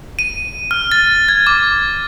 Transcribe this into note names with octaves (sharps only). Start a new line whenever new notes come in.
D#7
F6
A6
G#6
D6